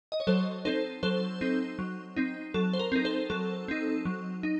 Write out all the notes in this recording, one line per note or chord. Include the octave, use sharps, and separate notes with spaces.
D#5
C#5
F#3 A4 C5
C4 D#4 A4 C5
F#3 A4 C5
C4 D#4
F#3
C4 D#4
F#3 A4
C5
A#4
C4 D#4
A4 C5
F#3 A4
C4 D#4
F#3
D#4